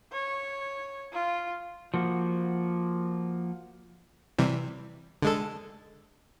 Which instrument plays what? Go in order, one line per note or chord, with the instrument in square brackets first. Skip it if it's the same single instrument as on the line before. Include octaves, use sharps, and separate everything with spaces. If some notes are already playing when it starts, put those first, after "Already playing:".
[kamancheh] C#5
F4
[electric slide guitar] F3 A#3 F#4
[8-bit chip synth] C3 E3 G3
D3 G#3 A4